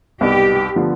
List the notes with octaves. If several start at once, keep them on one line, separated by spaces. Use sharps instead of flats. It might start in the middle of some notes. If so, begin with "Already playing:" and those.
C2 B2 B3 D#4 G4
D3 F3 B3 F4